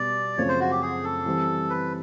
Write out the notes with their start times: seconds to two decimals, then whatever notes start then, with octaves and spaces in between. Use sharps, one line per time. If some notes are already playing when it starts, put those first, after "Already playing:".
Already playing: B2 G3 B3 D5
0.38 F#2 C#3 F3 A3 C4 C#5
0.49 C5
0.60 F#4
0.71 G4
0.82 G#4
1.04 A4
1.26 E3 G3 C4
1.70 B4